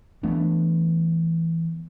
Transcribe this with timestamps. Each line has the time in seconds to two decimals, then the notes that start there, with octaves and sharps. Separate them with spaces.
0.23 E3 A3 B3 D4